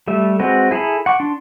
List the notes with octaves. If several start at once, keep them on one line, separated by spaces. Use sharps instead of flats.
G3 A3 E5
G#3 C4 F#4 B4
E4 G#4 A4 A#5 B5
F#5 C#6 D6
D4 C6